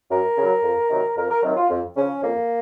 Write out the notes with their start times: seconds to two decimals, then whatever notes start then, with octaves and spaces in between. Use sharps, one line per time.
0.11 F#2 A#4
0.37 C#3 F#3
0.63 F2
0.90 C3 D#3 F#3
1.17 F2 A#4
1.30 A#4
1.43 C3 D#3 F#3
1.56 F4
1.70 F2
1.97 C#3 F3 C#4
2.22 F2 A#3